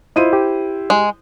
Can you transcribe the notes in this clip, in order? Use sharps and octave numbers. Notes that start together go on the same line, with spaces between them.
E4 F4 C5 D#5 D#7
G4
G#3